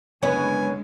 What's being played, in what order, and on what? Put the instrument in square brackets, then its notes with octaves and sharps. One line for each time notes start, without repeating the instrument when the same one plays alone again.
[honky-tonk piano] F#1 C#5 C#6 [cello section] D3 G#3 [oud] B3 B4 [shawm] G#5